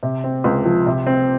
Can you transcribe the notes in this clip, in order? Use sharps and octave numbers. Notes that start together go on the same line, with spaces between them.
C3
C4
C#2
F3
C3
C4